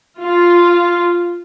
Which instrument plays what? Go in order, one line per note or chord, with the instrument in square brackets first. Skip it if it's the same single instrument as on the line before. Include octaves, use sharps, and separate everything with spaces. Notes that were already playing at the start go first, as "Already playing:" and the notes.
[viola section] F4